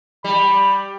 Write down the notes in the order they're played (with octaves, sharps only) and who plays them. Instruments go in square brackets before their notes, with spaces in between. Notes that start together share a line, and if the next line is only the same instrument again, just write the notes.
[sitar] G3 [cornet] B5